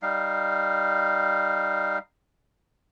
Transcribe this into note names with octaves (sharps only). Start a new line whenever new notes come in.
G3 D#4 F5